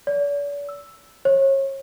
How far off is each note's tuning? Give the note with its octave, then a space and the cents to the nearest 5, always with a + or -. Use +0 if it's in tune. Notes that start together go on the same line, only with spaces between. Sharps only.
D5 -45
E6 +0
C#5 -30